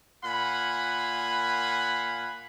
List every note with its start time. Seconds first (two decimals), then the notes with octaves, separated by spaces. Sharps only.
0.25 A#2 F5 F#5 G#5 B5